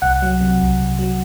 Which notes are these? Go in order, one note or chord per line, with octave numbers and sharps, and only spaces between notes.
C2 F#5
F#3
C3
C2
C2
F#3